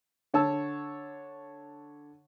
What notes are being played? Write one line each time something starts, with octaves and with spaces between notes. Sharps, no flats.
D3 C#5 A5 E6